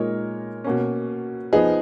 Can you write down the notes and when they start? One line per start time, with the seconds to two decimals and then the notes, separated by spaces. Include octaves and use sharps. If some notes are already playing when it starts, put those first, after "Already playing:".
Already playing: A#2 G#3 D#4 A#4 C#5
0.64 B2 A#3 C#4
1.53 F3 B3 D#4 G#4